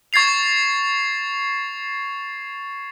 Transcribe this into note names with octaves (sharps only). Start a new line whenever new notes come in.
C#6 G#6 A6 C7 F7